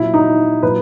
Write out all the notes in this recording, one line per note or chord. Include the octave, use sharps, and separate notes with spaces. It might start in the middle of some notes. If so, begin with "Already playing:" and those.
Already playing: A#2 F#3 E4
D#4
A#2 F#3 B4